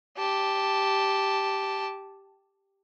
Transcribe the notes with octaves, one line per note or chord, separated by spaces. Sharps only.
G4 A5